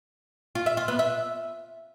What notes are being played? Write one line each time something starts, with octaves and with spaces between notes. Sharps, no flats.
F4
E5
F4
B3
E5